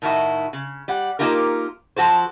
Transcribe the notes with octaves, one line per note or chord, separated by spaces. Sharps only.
A2 D#3 D#4 E4 F#4
C#3
G3 F#5
A#3 D#4 F4 G4 A#4
F3 F#4 A4 C5